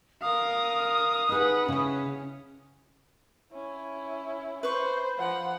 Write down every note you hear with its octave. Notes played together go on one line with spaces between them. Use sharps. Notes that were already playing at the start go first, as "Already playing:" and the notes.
A#4 F5 D#6
D#4 G#4 B4 F#5
C#3 C#4 E4
C#4 E4
B4 C5 C#6
F3 F#5